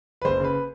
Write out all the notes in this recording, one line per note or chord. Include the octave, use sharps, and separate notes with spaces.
B4
F#1 C5
C#3 B4